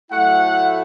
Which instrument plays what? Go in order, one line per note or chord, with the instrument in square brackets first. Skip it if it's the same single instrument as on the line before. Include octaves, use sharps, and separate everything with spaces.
[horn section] A2 F#3 A3 E4 F#5